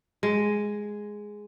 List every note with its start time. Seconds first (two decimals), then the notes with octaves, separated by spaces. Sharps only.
0.23 G#3